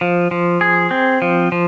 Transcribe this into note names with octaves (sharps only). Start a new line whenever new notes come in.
F3
F3
G#4
C4
F3
F3